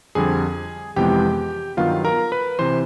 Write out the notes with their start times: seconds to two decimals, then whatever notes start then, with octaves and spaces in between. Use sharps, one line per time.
0.15 F2 D3 G3 C4 G#4 G#5
0.96 F2 C3 E3 G#3 B3 G4 G5
1.77 G2 D#3 F#3 B3 F4 F5
2.05 A#4 A#5
2.32 B4 B5
2.59 C3 E3 C5 C6